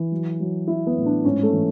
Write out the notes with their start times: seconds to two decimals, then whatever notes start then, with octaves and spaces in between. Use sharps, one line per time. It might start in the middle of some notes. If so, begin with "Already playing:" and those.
Already playing: E3
0.12 F#3
0.40 F#3
0.67 F#3 E4
0.87 B3
0.96 A2
1.06 D4
1.24 G#2 C#4
1.43 A3
1.53 E3